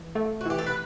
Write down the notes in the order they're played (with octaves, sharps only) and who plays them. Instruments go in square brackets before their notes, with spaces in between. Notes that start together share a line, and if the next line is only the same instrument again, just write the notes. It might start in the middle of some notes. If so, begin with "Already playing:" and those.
Already playing: [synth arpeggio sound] E3
A3
[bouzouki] F#4
[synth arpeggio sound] E3 [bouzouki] G4
[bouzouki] A4
B4